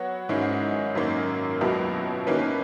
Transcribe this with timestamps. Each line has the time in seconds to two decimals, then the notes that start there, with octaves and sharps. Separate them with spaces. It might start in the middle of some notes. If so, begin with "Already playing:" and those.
Already playing: F#3 B3 F#4 C#5
0.29 G#2 D#3 G#3 C#4 E4
0.95 F#2 D#3 A#3 C#4
1.61 C#2 B2 F#3 B3 E4
2.27 D#3 A#3 C#4 E4 B4